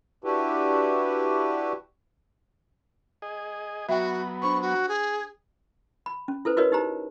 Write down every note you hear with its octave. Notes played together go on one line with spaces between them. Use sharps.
D4 E4 F#4 G4 B4
G#4 D#5
F#3 B3 F#4 E5 G5
D4 C5 B5 C#6
F#4
G#4
B5
C#4
E4 A4 B4 C5
E4 F#4 A#4 B4 C#5 D#5
D#4 G4 C5 A#5